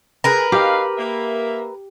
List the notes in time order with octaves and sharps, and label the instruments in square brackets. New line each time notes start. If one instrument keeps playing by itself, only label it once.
[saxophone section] G#4 [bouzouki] A#4 B4
[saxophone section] D#4 F5 [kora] G4
[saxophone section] A#3 E5